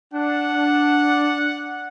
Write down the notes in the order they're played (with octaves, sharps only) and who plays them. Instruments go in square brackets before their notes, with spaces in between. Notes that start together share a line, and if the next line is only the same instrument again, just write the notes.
[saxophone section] D4 [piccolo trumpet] F#5